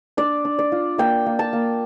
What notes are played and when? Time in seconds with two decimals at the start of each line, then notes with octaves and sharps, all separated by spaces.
0.17 D4 D5
0.45 D4
0.59 D5
0.72 F4
0.98 A#3 G5
1.26 A#3
1.39 A5
1.53 A#3